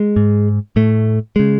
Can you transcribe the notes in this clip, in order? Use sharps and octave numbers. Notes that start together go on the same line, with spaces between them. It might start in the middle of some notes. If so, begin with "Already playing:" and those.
Already playing: G#3
G#2
A2 A3
C#3 G#3